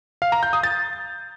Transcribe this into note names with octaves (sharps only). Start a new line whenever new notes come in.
F5
A#5
G6
D#6
A6